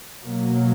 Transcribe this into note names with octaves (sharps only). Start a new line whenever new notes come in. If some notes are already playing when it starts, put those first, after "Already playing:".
B2 F#3 A#3